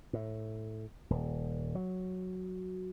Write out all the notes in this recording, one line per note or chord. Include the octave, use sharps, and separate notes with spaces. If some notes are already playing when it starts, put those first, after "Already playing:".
A2
D#1
F#3